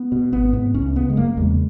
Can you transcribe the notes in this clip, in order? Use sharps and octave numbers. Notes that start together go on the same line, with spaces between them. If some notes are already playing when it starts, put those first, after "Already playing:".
Already playing: B3
B2
G#1 B3
G#2 B3
C#2 C#4
C#3 B3
G#3
F#1 A#3
E2 C#3 G#3